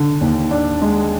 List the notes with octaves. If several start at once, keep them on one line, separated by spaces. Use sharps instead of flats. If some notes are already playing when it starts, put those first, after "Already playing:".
Already playing: D3
D#2
D4
G#3